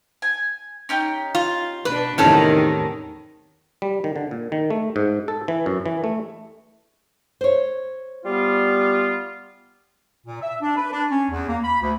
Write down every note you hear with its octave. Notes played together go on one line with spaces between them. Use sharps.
G#5
C#4 D#4 G4
F4
B2 D4 B4
E2 A2 C3 D#3 C#4 A4 A5
G3
D#3
D3
A#2
D#3
A3
G#2
A4
E3
F#2
E3
A3
C5 C#5
G3 B3 F4
A#2
E5
D4
B4
D4
C#4
E2
A#3
B5
D2